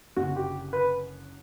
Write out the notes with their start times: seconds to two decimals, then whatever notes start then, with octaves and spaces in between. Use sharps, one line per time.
0.16 F#1 F#2 D3 F#4
0.36 G4
0.73 B4